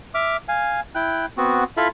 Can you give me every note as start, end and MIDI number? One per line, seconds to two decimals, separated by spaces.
0.15 0.37 76
0.15 0.37 86
0.15 0.37 89
0.48 0.80 77
0.48 0.80 80
0.95 1.26 64
0.95 1.26 79
0.95 1.26 90
1.37 1.64 59
1.37 1.64 60
1.37 1.64 66
1.77 1.88 64
1.77 1.88 65
1.77 1.88 69
1.77 1.88 76
1.77 1.88 77
1.77 1.88 83